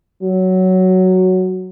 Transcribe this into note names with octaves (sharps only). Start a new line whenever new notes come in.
F#3